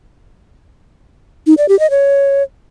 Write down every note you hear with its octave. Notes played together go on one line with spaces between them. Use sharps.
D#4
D5
G4
D#5
C#5